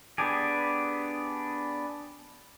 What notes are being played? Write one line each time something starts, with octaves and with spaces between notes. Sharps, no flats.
B3 D4 G4 G#4